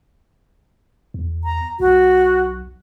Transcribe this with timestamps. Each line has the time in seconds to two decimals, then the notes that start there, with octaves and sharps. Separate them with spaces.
1.14 E2
1.44 A#5
1.80 B1 F#4